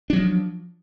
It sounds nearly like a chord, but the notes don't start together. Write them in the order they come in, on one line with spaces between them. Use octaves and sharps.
D4 F#3 F3